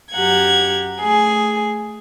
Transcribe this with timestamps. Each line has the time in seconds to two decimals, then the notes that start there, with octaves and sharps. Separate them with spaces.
0.15 F#2 G4 F#5 A#5 G#6
1.00 A3 G#4